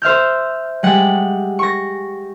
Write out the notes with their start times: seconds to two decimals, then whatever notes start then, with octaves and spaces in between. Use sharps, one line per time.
0.02 C5 E5 F6 G6
0.83 G3 G#3 F#5
1.59 C#6 A#6